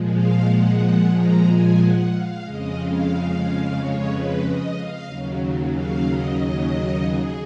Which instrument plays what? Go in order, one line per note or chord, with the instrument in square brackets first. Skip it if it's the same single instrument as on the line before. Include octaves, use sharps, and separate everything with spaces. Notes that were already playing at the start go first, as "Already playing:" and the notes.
Already playing: [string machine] A#2 F3 G#3
F5
F#5
F#5
A#5
G#5
F#5
F5
F2 C#3 G#3 D#5
F5
C#5
B4
D#5
F5
D#2 C#3 F#3
F5
D#5
D#5
G#4